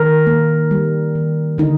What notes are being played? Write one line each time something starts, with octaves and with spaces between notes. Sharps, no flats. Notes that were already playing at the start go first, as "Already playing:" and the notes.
Already playing: D#3 A#4
A#3
G3
D#3
D3 D#4